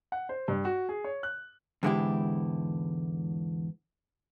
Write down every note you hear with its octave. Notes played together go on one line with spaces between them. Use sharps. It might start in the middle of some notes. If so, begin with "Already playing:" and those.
F#5
C5
G2
F#4
G#4
C#5
F#6
E2 G#2 D3 G#3 E4 G4